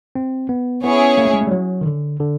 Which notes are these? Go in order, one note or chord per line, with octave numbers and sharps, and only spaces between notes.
C4
B3
B3 C#4 E4 G#4 C#5
A#3
A3
G#3
A3
G3
F#3
D#3
D3
D3